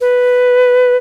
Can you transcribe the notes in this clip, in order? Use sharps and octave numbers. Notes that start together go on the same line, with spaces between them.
B4